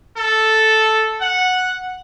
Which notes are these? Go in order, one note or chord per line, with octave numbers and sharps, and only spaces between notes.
A4
F#5